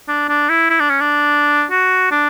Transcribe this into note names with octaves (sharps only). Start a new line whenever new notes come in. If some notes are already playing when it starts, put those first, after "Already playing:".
D4
D4
E4
E4
D4
C#4
D4
F#4
D4